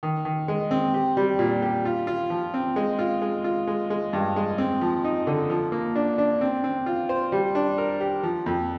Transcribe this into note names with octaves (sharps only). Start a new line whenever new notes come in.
D#3
D#3
G#3
C4
G4
G3
A#2
G4
F4
F4
F3
C4
G#3
F4
G#3
F4
G#3
G#3
G2
G#3
C4
F3
D#4
D3
F3
A#3
D4
D4
C4
C4
F4
C5
G3
D4
A#4
G4
F3
F2